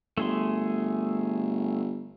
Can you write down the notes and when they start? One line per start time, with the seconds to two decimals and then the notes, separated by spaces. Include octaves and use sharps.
0.18 G1 A3 G#4 C6